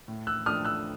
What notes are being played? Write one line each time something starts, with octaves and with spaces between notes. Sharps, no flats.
A2
E6 F#6
F3 A3 D4 D#6 F6
E6 F#6